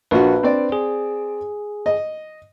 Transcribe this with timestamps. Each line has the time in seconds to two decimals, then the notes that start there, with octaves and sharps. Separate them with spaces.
0.11 A#1 D4 F4 F#4 B4
0.43 C4 D5
0.72 G#4
1.86 D#5